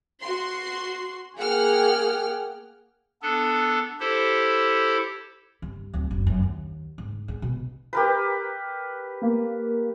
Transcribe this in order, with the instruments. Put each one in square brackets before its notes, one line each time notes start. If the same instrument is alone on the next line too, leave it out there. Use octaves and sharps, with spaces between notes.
[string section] F#4 C6
[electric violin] A#3 G#4 [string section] F#5 G5 F6
[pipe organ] B3 D4 A4
E4 G4 A4 C5
[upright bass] G2
D1
F#1
F#2
D#2
G#2
G#3
B2
[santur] G4 A#4 B4
[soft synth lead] A#3